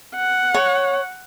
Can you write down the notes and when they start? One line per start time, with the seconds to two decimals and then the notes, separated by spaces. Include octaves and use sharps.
0.16 F#5
0.54 C#5